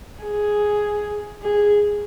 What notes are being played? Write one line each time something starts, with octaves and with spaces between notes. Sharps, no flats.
G#4
G#4